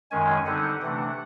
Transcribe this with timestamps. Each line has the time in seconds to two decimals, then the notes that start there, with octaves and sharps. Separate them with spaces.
0.11 F#2 D#3 G#3 C#4 G#5
0.46 D3 G3 C4 D#4 F#5
0.81 C3 E3 A3 D4 F#5